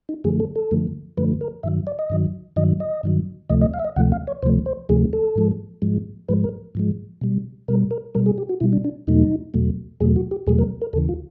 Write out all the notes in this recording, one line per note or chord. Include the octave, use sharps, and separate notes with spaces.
D#4
F#2 D3 F3 A3 G#4
A4
A4
F#2 D3 F3 A3
F#2 D3 F3 A3 B4
A#4
G2 D#3 F#3 E5
D5
D#5
G2 D#3 F#3
G2 D#3 F#3 D#5
D#5
G2 D#3 F#3
D2 C3 F3 A3 D#5
D#5
F5
E5
D#5
D2 C3 F3 A3 F#5
F5
C#5
D2 C3 F3 A3 C5
C5
D2 C3 F3 A3 G#4
A4
G#2 F3 G#3
G#2 F3 G#3
G#2 F3 G#3 B4
A#4
G#2 F3 G#3
B2 G3
B2 G3 A#4
A#4
B2 G3 A#4
G#4
G4
F#4
B2 G3 E4
D4
D4
E2 B2 F#3 A3 D#4
E2 B2 F#3 A3
E2 B2 F#3 A3 G#4
F#4
G4
E2 B2 F#3 A3 G#4
A#4
A#4
D#2 C#3 E3 A4
F4